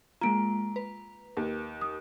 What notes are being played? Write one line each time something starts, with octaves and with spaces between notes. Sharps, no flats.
G#3 A#3 F4 A#5 D7
B4
D#2
D#6